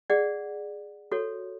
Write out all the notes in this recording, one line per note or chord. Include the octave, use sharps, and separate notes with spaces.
G#4 D5 F#5
F#4 A4 C#5